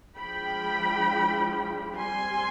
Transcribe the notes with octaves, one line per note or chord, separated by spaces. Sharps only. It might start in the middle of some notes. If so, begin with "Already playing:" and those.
F3 G#3 D4 G5 B5
G3 C4 G#5 C6